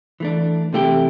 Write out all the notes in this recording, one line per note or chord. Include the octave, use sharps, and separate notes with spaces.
E3 A3 D4
C3 E3 A3 E4 G4